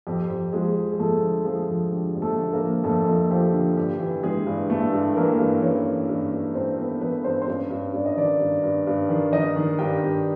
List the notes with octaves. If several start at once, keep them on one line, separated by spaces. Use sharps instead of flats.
F2 G4
F2
F3 G#3 G#4
F3
G#4
F2 A3 A4
D3
F3 G#3 G#4
F2
D3 G4
F2
A3 A4
D3
A#3 A#4
F3
F2 A3 A4
F2
F3 G4
D3
G2 G4
E3
E3 G#3 G#4
G2
G2 A3 A4
G2
E3 A#3 A#4
G2
E3 C#4 C#5
E3
G2
G2
G2 C4 C5
G2 B3 B4
E3 B3 B4
G2 C4 C5
C5
G2 C#4 C#5
G2
G2 D5
D#5
D#3 D4 D5
G2
G2
G2
D#3
D#3 D#4 D#5
D#3
G2 G4 G5
G2